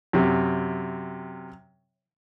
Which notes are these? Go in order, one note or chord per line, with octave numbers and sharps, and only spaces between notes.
F#2 C3